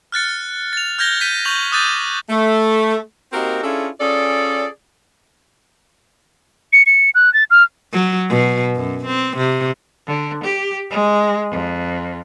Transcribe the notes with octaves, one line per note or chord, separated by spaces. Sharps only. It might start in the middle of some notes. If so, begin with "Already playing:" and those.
F6 F#6 A6 C#7
A6 F7
F6 G6 G#6 A#6 G7
G6 B6 D#7
C#6 G6 A#6 F7 F#7
D6 D#6 F#6 G6 A6 D#7
A3
A#3 C4 D#4 F#4 G4 A#4
C#4 D4 E4 F4 G#4 A4
C#4 F4 G#4 A4 D5
C#7
C#7
F#6
A6
F6
F#3
B2
F#2
C4
C3
D3
G4
G#3
F2